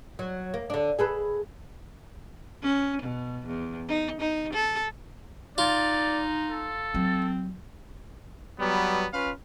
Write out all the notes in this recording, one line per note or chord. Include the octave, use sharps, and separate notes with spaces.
F#3
A#3
D3 D4
G#4 A4 B4
C#4
B2
E2
D#4
D#4
A4
D#4 F4 D5
A4
F#3 C4
F#3 G3 B3
C#4 F4 B4 F5